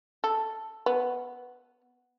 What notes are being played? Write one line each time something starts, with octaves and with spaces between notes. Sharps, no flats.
A4
B3